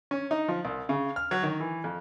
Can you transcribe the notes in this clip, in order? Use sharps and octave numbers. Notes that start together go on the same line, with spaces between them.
C#4
D#4
F3
C2
C#3
F6
F#3
D#3
E3
F2